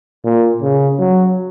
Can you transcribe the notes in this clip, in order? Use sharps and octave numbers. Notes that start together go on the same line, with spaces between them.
A#2
C#3
F#3